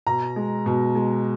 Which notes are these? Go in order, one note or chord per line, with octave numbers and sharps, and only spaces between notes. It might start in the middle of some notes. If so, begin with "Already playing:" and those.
B2 A#5
G#3
B2
G#3